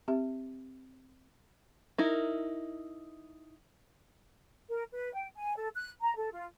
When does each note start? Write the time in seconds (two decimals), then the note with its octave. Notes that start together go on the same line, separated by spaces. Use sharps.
0.08 C4 G4 E5
1.98 D#4 E4 A#4
4.68 A#4
4.92 B4
5.15 G5
5.35 G#5
5.56 A4
5.75 F#6
6.01 A#5
6.17 A4
6.32 F4